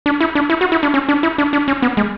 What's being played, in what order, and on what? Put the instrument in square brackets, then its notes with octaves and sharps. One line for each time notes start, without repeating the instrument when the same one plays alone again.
[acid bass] D4
E4
D4
E4
F#4
E4
D4
C#4
D4
E4
D4
D4
C#4
B3
G#3